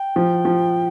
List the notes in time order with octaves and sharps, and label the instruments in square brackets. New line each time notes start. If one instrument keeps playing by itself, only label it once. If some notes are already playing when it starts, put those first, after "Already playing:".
Already playing: [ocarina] G5
[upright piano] F3
F3